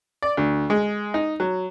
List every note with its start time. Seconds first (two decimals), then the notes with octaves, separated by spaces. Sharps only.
0.22 D5
0.37 D2
0.70 G#3
1.14 D#4
1.40 F#3